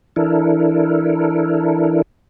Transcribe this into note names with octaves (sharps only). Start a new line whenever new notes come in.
E3 D4 E4 A4 A#4